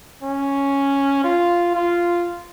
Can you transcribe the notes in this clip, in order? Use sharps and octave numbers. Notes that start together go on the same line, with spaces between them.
C#4
F4
F4